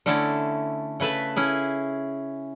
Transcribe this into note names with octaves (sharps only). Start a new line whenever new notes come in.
D3 A3 C#4 E4 A5
C#3 A3 B4 E5 A5
C#4 E4 G#4